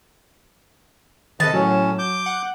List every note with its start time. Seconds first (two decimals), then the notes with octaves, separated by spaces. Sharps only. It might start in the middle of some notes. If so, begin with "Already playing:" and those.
1.40 C3 D#3 A4 B4 D#5 A5
1.53 A2 F#3 C#4
1.99 D6 G6
2.26 F#5